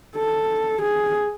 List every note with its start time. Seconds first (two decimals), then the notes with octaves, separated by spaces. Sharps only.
0.16 A4
0.82 G#4